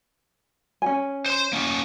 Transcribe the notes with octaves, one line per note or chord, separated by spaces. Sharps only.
C#4 G#5
C5 C6
A#3 C#4